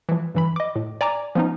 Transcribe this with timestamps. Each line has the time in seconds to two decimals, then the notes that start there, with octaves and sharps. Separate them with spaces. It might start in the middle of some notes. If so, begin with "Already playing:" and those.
0.09 E3 F3
0.35 G2 E3 B5
0.56 D#5 D6
0.76 A2
1.01 D5 G#5 A#5 D6
1.35 F3 B3 C#4 D#4